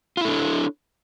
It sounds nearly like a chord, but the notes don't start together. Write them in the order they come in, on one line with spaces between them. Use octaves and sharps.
F4 E4 A4 D4 C#5